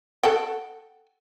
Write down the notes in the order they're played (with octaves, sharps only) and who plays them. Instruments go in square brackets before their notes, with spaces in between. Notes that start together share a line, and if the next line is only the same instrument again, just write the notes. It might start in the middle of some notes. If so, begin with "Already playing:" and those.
[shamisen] A4 F#5 G5